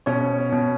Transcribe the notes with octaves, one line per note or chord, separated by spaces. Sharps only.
B2 C#4 C#5
B2